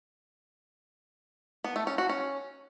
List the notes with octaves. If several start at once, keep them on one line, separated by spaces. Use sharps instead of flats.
B3
A3
C#4
F#4
C#4